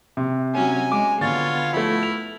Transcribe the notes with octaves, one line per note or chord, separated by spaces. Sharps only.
C3
F#3 C#4 G#5
G#3 D6
D3 B3 F4 C#5 A6
F3 A3 E4
F7